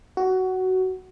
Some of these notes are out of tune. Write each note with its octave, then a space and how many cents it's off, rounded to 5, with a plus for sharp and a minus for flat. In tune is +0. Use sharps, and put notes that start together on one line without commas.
F#4 +15